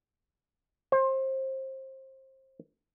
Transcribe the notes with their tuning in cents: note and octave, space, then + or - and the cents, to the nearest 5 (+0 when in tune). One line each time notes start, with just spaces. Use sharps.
C5 +25